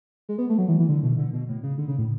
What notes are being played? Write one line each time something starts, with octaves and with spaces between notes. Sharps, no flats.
G#3
B3
A3
F#3
E3
E3
D3
B2
D3
B2
A2
C#3
D3
C#3
A2